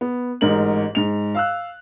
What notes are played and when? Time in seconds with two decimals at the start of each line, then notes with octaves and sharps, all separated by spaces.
0.01 B3
0.41 A1 G#2 A#4 F#7
0.95 G#2 F7
1.35 F5 E6 F#6